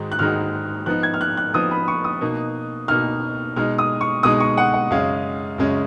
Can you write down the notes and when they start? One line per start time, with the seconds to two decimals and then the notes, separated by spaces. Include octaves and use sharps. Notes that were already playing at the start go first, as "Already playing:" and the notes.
Already playing: G#2 D#3 G#3 D#4 F#4
0.12 F#6
0.19 G#2 D#3 G#3 D#4 F#4 F6
0.86 F3 B3 D#4 F#6
1.03 G#6
1.14 F6
1.21 F#6
1.37 F#6
1.54 F3 B3 D#4 D#6
1.71 B5
1.88 C#6
2.04 D#6
2.21 B2 A#3 D#4
2.88 B2 A#3 D#4 F6
3.56 B2 G#3 D#4 F6
3.78 D#6
4.01 C#6
4.23 B2 G#3 D#4 D#6
4.40 C#6
4.57 F#5
4.74 F#5
4.90 F#2 C#3 G#3 C#4 F5
5.58 F#2 C#3 G#3 C#4